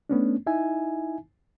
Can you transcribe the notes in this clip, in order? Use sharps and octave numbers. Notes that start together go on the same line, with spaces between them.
A3 B3 C#4 D4
D#4 E4 E5 G#5